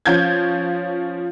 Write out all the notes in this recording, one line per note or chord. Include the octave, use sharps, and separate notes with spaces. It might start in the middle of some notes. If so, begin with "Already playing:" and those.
F3 C#4 F4 G6 G#6